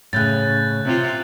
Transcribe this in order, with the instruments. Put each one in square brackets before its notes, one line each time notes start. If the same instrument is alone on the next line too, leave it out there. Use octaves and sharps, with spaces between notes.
[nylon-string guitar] A2 C#3 [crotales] F#6 G6 A6
[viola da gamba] C3 F4